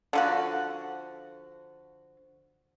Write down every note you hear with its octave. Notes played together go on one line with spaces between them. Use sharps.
D3 F3 F#4